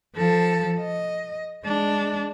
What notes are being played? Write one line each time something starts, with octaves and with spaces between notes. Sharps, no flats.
F3 A4
D#5
G#3 D4